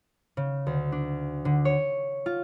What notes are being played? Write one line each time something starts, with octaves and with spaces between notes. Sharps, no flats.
C#3
D2
D4
D3
C#5
F4